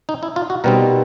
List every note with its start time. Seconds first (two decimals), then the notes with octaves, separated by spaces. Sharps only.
0.09 D#4
0.23 E4
0.36 F4
0.50 F#4
0.64 B2 G3 C4 D#4 A#4